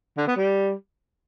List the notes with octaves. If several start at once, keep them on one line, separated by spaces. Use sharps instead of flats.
D3
B3
G3